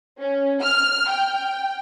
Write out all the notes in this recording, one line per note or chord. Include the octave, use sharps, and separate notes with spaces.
C#4
F6
G5